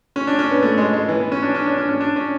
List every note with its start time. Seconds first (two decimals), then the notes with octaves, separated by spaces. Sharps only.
0.16 C#4
0.27 D4
0.39 C#4
0.51 B3
0.63 A3
0.78 G#3
0.93 G#3
1.08 E3
1.20 B3
1.32 C#4
1.43 D4
1.55 C#4
1.66 D4
1.78 C#4
1.89 C#4
2.01 D4
2.16 C#4